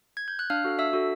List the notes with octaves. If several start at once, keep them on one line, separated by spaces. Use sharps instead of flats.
G#6
G6
F#6
D4 F5 F6
F#4 A4
D4 E5 E6
F#4 A4